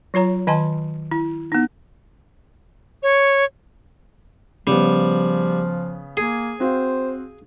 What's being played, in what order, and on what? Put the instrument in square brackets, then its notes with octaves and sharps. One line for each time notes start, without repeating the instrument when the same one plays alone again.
[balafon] F#3 F4 C#5 A#5
D#3 D#5 G#5 A5 C6
E4
B3 D#4
[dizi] C#5
[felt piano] C#3 B3 [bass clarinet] F3 [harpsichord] G3
[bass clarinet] A#3 [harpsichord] G#4 [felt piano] G#5
[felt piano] C4 F#4 F5 [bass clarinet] C5